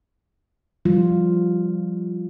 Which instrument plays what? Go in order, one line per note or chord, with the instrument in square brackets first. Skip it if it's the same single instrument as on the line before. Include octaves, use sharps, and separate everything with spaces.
[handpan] F3 G3 F4